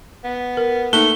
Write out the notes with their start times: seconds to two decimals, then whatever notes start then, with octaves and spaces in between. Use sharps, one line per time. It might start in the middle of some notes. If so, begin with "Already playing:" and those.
0.24 B3
0.57 A#4
0.93 A3 A#3 D#4 G7